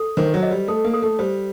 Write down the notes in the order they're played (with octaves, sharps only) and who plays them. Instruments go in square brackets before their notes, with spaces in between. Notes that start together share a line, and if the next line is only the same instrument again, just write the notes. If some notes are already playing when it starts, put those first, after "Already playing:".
Already playing: [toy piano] A4
[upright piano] D#3 [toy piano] C5
[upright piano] F#3
[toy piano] D#5
[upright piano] G3
[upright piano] A3 [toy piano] A4
[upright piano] A#3
[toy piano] A4
[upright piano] A3
[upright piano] G3 [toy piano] C5